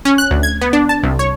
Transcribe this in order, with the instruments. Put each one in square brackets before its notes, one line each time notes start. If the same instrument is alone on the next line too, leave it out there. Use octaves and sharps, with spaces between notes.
[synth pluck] C#4
F#6
D2
G#6
B3
D4
A5
C2
C#5